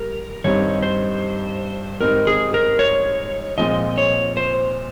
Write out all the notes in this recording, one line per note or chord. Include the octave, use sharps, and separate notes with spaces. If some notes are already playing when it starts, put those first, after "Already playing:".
Already playing: G3 A#4
G2 D#3 G3 C4 D#4 C#5
C5
G#2 D#3 G3 C4 D#4 A#4
G#4
A#4
C#5
A#2 F3 G#3 C4 D#5
C#5
C5